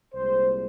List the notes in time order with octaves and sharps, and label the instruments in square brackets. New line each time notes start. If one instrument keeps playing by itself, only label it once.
[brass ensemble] C2 A#2 G#3 C5